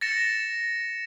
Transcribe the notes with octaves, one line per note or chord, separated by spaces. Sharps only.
A6 A#6 C#7 E7